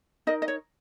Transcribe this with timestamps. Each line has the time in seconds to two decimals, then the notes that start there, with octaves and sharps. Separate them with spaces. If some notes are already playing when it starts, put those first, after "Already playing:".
0.27 D#4 A#4 D#5
0.42 D#5
0.48 C#5